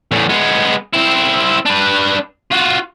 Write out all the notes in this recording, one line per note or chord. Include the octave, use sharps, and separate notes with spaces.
E2 A2
G#3 B3
C4 E4
D4 B4
F4 F#4